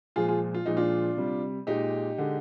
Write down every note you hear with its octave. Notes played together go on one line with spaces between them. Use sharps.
A#2 F3 G#3 F4 G#4
F4 G#4
F4
A#2 F3 G#3 D#4
D4 F4
C3 G3
A#2 G#3 D#4 G4
D3 G#3